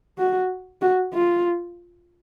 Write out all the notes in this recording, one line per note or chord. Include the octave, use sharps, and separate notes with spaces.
F#4
F#4
F4